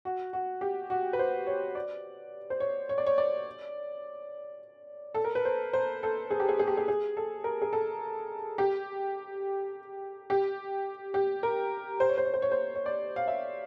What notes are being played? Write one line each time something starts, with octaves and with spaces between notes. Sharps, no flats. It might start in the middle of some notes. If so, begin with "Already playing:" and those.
F#4
F#4
G4
F#4
B4
C5
C#5
D5
C5
C#5
C#5
D5
C#5
D5
A4
A#4
B4
C5
C5
A4
G#4
G4
G#4
G#4
G4
G#4
G#4
A4
A#4
G#4
A4
G4
G4
G4
A#4
C5
C#5
C5
C#5
C5
C#5
C5
C#5
D5
F5
E5